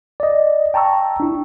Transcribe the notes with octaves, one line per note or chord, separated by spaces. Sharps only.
D5 D#5
G5 A5 A#5 C#6 E6
D4 E4